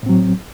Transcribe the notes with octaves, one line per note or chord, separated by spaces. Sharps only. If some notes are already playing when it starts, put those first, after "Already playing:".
A2 F#3 C4